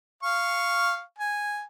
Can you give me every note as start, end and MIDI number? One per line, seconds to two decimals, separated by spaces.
0.23 1.02 77
0.23 1.02 85
1.18 1.63 80